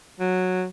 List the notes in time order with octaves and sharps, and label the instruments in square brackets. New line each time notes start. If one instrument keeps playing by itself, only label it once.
[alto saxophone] F#3